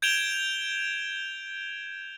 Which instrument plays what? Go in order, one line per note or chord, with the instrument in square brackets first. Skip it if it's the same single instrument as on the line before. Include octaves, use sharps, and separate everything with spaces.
[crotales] G6 G#6 D7 E7 F7 G7